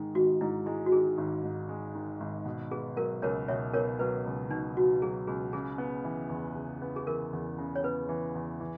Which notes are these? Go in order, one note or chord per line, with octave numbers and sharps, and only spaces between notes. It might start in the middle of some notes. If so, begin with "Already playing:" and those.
Already playing: G#2 D#3 G#3
G#1 F#4
G#2 E4
G#3 E4
F#4
D#3 G#4
G#1
G#2
G#3
D#3
G#1
B2
B3 G#4
F#3 A#4
C#2 A#4 C#5
B2 C#5 E5
B3 A#4 C#5
F#3 B4
C#2
B2 D#4
B3 F#4
F#3 G#4
C#2 G#4
C#3 G#4
B3
E3
E2
C#3
B3
G#4
E3 A#4
E2
C#3
C#5
B3 B4
E3
E2
E3